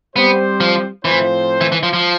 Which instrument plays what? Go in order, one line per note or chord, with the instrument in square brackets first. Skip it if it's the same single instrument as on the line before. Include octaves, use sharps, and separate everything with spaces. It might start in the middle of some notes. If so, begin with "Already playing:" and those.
[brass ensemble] G3 C4 G4 C5 [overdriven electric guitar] B3
[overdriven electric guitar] F3
[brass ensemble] A2 F3 C4 F4 C5 [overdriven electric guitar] E3
[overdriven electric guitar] E3
E3
F3
F3